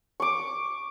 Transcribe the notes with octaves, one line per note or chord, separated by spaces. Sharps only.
C#6 D6